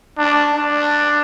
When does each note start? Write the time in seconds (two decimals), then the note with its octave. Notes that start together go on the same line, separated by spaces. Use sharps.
0.18 D4
0.54 D4